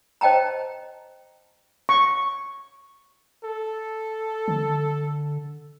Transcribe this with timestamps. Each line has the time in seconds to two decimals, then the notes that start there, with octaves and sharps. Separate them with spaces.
0.21 C5 D#5 G5 A5 A#5
1.89 C#6
3.44 A4
4.48 D3